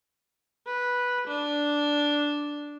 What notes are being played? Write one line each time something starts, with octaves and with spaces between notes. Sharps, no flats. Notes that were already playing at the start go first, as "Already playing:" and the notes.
B4
D4